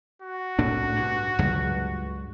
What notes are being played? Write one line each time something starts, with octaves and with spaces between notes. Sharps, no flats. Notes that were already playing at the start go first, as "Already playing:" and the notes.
F#4
C2 A2 D4
G2
C#2 G2 F#3